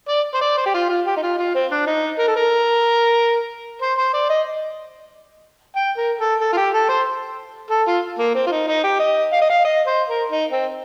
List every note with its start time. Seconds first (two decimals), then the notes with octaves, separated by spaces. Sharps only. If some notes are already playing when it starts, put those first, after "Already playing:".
0.09 D5
0.34 C5
0.41 D5
0.58 C5
0.66 G4
0.74 F4
0.89 F4
1.06 G4
1.17 D#4
1.23 F4
1.39 F4
1.55 C4
1.71 D4
1.87 D#4
2.19 A#4
2.28 A4
2.36 A#4
3.82 C5
3.98 C5
4.14 D5
4.30 D#5
5.76 G5
5.97 A#4
6.19 A4
6.40 A4
6.53 F4
6.57 G4
6.74 A4
6.89 C5
7.71 A4
7.87 F4
8.19 A#3
8.35 C4
8.47 F4
8.52 D#4
8.68 D#4
8.84 G4
9.00 D#5
9.33 F5
9.42 D#5
9.49 F5
9.65 D#5
9.87 C5
10.08 A#4
10.30 D#4
10.52 C4